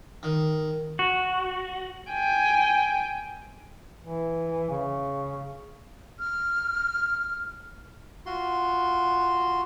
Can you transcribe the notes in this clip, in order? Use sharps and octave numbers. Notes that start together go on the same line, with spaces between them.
D#3
F#4
G5 G#5
E3
C#3
F6
F4 F#4 C6